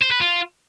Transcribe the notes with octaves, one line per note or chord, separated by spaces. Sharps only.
C5
B4
F4